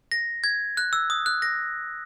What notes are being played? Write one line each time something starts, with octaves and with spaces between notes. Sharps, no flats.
A#6
G#6
F#6
E6
D#6
F#6
A#6